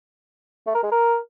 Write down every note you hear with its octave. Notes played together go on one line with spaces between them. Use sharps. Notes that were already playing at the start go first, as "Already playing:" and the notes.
A3
A#4
G#3
A#4